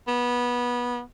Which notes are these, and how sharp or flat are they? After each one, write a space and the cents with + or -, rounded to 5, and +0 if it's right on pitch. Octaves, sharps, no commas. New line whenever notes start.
B3 -20